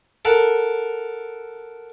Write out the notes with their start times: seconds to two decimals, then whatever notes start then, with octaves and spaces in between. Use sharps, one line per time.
0.25 A4 A#4 F#5 A#5